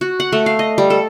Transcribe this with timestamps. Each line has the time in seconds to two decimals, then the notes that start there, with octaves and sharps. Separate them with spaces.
0.01 F#4
0.20 F#5
0.32 A3
0.46 F5
0.59 D#5
0.78 G3
0.90 A4